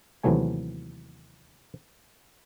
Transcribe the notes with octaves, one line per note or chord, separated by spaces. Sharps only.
D#2 C3 E3 F#3 A3 G#5